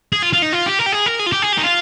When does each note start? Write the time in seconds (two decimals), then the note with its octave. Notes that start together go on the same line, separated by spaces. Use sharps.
0.12 G#4
0.22 F4
0.33 F4
0.42 D#4
0.53 F4
0.66 G4
0.79 A#4
0.86 G4
0.92 G#4
1.06 A#4
1.19 G#4
1.26 F4
1.32 G4
1.42 G#4
1.53 G4
1.58 D#4
1.63 F4